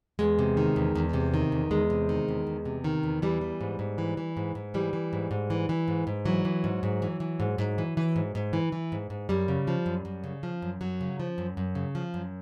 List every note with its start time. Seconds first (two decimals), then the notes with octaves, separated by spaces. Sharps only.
0.19 E2 G#3
0.39 C3
0.57 D#3
0.76 E2
0.95 E2
1.13 C3
1.34 D#3
1.52 E2
1.71 E2 G#3
1.90 C3
2.09 D#3
2.28 E2
2.47 E2
2.65 C3
2.84 D#3
3.03 E2
3.22 E3 G3
3.41 E3
3.61 G#2
3.79 G#2
3.98 E3
4.17 E3
4.37 G#2
4.55 G#2
4.74 E3 G3
4.93 E3
5.13 G#2
5.31 G#2
5.50 E3
5.69 E3
5.88 G#2
6.07 G#2
6.26 E3 F#3
6.45 E3
6.64 G#2
6.83 G#2
7.02 E3
7.20 E3
7.40 G#2
7.58 G#2
7.78 E3
7.97 E3
8.16 G#2
8.35 G#2
8.53 E3
8.72 E3
8.92 G#2
9.10 G#2
9.29 F#2 G3
9.48 C#3
9.67 F3
9.86 F#2
10.05 F#2
10.24 C#3
10.43 F3
10.62 F#2
10.81 F#2 F#3
11.01 C#3
11.20 F3
11.38 F#2
11.57 F#2
11.75 C#3
11.95 F3
12.14 F#2